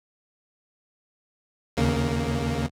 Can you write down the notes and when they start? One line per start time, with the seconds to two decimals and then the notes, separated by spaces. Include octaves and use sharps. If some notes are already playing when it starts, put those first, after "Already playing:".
1.77 D#2 C#3 A#3